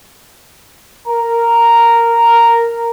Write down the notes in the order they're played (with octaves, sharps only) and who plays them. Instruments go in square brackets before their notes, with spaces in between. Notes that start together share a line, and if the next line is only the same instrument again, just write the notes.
[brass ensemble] A#4 A#5